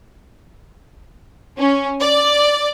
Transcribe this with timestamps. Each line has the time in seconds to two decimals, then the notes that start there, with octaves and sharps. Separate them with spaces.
1.57 C#4
2.01 D5